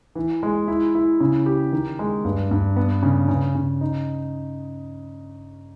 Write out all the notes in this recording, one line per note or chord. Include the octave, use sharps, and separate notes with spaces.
E3
G#3
E4
E4
C#3
G4
D#3
G#3
G2
G2
B3
C#3
C#3
C#3
D#4